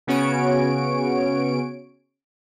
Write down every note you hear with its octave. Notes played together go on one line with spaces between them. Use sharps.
C#3 B3 C#4 F#4 C#5 D7